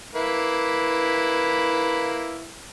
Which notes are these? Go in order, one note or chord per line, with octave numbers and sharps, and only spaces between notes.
A#3 E4 B4